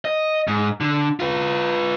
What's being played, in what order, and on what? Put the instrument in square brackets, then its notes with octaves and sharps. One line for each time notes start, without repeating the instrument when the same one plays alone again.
[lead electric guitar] D#5
G#2
D3
F4 B4